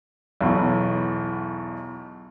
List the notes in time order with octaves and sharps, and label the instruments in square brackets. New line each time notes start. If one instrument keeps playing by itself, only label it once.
[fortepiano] B1 E2 B2